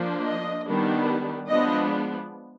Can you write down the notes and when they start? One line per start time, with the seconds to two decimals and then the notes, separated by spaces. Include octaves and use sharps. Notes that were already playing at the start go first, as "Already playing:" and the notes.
Already playing: F3 A#3 D4
0.26 D#5
0.67 D#3 G3 B3 D4
1.49 F3 G#3 B3 D4 D#5